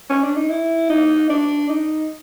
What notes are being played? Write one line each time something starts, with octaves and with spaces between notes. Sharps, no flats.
C#4
D4
D#4
E4
D#4
D4
D#4